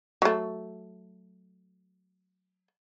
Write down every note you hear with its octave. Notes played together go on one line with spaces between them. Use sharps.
F#3 A3